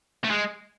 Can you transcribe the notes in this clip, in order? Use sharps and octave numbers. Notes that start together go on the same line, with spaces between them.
A3
G#3